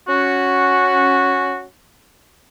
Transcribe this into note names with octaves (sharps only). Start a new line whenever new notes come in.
C#4 F#4